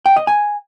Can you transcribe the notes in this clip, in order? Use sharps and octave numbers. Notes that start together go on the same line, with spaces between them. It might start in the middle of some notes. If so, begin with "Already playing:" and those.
G5
D#5
G#5